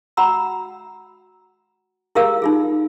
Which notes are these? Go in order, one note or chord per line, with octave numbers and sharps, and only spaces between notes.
F#4 F#5 A#5 B5 E6
E4 G4 G#4 A#4 F5 E6
D#4 F4 G#4